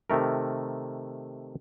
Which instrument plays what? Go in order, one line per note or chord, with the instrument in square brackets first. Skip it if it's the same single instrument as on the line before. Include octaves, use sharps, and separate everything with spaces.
[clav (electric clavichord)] C3 D#3 A3 A#4